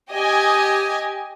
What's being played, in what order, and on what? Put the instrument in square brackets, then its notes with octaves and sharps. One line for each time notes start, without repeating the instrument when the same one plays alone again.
[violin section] G4 D#5 G#5